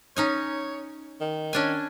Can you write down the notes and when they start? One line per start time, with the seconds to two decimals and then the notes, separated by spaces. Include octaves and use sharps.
0.16 C#4 D#4 C#5 G#5
1.21 D#3
1.53 C#4 D4 G#5